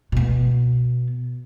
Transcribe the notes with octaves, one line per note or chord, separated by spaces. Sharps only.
B2 B3